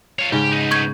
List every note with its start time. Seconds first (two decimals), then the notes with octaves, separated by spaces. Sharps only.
0.19 F4 C#5
0.32 G#2 C#3 G4
0.52 B3 D#4
0.71 C#6 G6 G#6